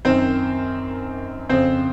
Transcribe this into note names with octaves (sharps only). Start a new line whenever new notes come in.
F#2 D#3 C4 C5
F2 C#3 C4 C5